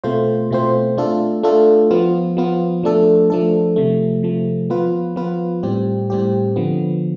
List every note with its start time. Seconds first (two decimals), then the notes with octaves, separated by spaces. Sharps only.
0.04 B2 A3 C4 F4 C5
0.51 B2 A3 C4 F4 C5
0.97 A3 D4 F4 A4
1.43 A3 D4 F4 A4
1.90 F3 B3 F4
2.37 F3 B3 F4
2.83 F3 A3 D4 A4
3.30 F3 A3 D4 A4
3.76 C3 F3 A3
4.23 C3 F3 A3
4.70 F3 B3 F4 B4
5.16 F3 B3 F4 B4
5.63 A2 G3 C4 G4
6.10 A2 G3 C4 G4
6.56 D3 F3 B3